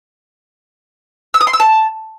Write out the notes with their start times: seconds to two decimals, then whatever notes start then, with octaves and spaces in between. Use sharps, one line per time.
1.34 E6
1.41 D#6
1.47 C6
1.53 E6
1.60 A5